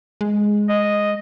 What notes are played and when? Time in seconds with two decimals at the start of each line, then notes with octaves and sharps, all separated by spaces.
0.21 G#3
0.69 D#5